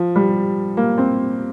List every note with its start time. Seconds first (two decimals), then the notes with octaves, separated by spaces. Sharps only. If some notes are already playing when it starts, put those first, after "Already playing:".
Already playing: F3
0.16 G3
0.77 A#3
0.98 C4